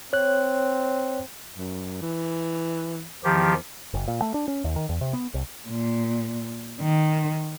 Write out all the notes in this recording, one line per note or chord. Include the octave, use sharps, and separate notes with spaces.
C4 C#5 F#6
F#2
E3
E2 D#3 F3 G4
F#1
A#2
A3
D4
C#4
D#2
D#3
E2
C3
B3
C2
A#2
D#3